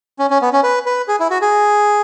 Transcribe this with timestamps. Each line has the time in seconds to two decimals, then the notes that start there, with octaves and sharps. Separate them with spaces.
0.19 C#4
0.30 C#4
0.42 B3
0.53 C#4
0.63 B4
0.86 B4
1.08 G#4
1.20 E4
1.30 F#4
1.42 G#4